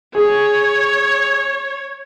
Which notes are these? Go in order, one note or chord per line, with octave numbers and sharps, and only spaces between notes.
G#4 C#5